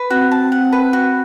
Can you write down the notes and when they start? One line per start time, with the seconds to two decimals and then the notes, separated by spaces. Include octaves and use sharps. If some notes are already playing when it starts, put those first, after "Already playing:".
Already playing: B4
0.10 C4 F#4
0.31 A5
0.52 F#5
0.73 B4
0.93 F#4